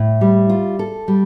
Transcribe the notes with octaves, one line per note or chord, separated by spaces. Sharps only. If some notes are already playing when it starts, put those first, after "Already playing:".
Already playing: A2
G3
F4
A4
G3